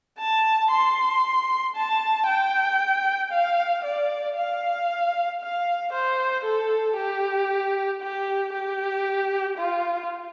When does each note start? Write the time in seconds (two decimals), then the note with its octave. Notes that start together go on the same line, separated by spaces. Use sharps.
0.18 A5
0.70 C6
1.76 A5
2.27 G5
3.32 F5
3.84 D5
4.37 F5
5.41 F5
5.93 C5
6.45 A4
6.96 G4
8.02 G4
8.53 G4
9.57 F4